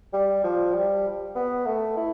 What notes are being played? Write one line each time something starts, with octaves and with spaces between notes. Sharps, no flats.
G3
F3
G3
B3
A3
E4